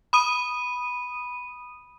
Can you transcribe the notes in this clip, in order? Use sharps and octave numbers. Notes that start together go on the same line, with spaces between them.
B5 D#6 D#7